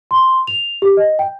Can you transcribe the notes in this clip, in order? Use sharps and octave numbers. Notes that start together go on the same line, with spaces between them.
C6
F7
G4
D#5
G5